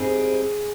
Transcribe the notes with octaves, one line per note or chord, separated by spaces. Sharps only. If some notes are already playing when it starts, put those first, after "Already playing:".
Already playing: G#2 G3 C4 G#4